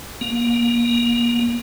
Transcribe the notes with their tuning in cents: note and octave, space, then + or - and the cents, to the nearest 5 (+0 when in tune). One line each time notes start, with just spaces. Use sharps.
A#3 +30